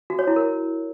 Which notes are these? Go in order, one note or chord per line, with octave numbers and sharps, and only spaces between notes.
F#4
C#5
E4
A#4